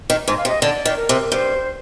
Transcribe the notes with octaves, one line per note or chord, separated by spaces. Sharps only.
D#3
G#2 D#5
F5
C3
D#5
D3 D5
D#3
A#4
C3
G2 C5